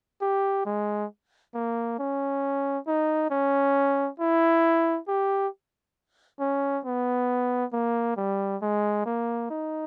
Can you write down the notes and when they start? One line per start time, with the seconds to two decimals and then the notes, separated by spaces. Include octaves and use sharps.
0.22 G4
0.66 G#3
1.55 A#3
1.99 C#4
2.88 D#4
3.31 C#4
4.20 E4
5.08 G4
6.40 C#4
6.85 B3
7.73 A#3
8.17 G3
8.62 G#3
9.06 A#3
9.51 D#4